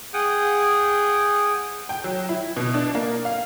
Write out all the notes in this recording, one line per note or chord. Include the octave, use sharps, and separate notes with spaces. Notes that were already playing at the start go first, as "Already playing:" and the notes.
G#4 F#5 G5 D#6
G5
F#3
E4
B2
D4
A#3
F5